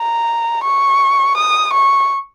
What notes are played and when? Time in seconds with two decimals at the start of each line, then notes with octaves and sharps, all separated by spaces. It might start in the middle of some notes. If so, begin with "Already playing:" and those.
Already playing: A#5
0.64 C#6
1.38 D#6
1.73 C#6